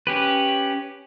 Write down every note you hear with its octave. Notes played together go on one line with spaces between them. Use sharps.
C#4 G4 B4